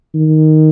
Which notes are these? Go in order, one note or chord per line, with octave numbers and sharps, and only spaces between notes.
D#3